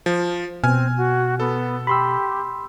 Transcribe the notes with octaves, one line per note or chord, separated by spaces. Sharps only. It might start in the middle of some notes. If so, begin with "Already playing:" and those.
F3
B2 C4 G#5 F6
F#4
B3 A4
G4 B5 C6 E6